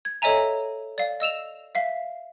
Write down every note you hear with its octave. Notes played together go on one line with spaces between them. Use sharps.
G#6
A4 C#5 D#5 E5 G#5 A#5
D5 F5
D#5 E6 E7 F7
E5 F5